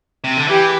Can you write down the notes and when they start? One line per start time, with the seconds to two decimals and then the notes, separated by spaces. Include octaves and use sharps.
0.24 C3
0.37 D3
0.48 E3 G4